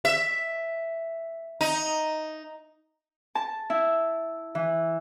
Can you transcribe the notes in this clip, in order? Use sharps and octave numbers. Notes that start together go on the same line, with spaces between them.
E5
D#4
A5
E4
E3